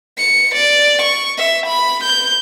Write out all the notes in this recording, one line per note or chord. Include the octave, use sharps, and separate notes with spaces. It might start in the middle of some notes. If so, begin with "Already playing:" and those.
C#7
D5
C#6
E5
B5
G6